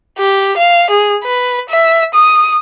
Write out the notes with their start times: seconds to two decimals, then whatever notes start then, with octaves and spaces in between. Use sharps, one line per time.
0.19 G4
0.57 F5
0.90 G#4
1.24 B4
1.69 E5
2.14 D#6